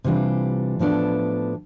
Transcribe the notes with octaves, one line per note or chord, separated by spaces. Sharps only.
C3 E3 G3 D4 F4
A2 F3 B3 D4 A4